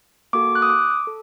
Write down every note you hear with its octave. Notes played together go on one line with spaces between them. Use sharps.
A#3 F#4 A4 D6
F#6
D#6
D6
A4